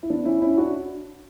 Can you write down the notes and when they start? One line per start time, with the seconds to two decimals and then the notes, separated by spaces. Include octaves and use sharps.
0.03 E4
0.10 B3 D4
0.25 C#4 E4
0.42 C#4 E4
0.58 D4 F#4